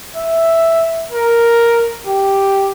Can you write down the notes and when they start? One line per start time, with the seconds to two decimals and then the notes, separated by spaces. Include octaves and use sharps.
0.16 E5
1.12 A#4
2.06 G4